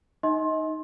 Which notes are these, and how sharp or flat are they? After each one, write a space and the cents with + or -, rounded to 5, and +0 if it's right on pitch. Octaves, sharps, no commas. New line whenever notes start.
D#4 -5 D#5 +35 C6 +25